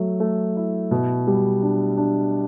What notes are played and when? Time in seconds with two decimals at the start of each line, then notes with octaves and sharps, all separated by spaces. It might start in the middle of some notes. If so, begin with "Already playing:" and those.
Already playing: F#3 A3
0.20 A3
0.57 E4
0.91 B2
1.27 G3
1.62 D4
1.97 D4